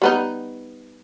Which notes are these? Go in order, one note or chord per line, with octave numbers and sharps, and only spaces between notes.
G3 B3 D#4